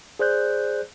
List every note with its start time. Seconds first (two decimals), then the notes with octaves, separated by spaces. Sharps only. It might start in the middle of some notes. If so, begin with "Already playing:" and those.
0.19 G#4 C5 D5 F#6 G6